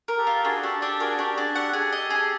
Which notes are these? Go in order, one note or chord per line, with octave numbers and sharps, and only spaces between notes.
A#4
G4 A4
F4
D4 F#4 G#4
D4 G4 A4
D4 G4 A4
F#4 G#4 A#4
D4 G4
D4 F#4 G#4
G4 A4 F#5
G#4
D#5
G#4